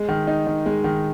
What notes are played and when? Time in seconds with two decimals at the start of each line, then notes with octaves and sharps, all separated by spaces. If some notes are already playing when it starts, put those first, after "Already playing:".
Already playing: G#3
0.08 D#3
0.27 D#4
0.47 D#3
0.66 G#3
0.84 D#3